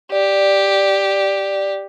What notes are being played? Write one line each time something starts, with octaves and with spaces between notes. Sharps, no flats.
G4 D5